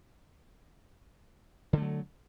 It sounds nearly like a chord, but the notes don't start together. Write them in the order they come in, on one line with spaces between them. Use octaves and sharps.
D3 A3 F#3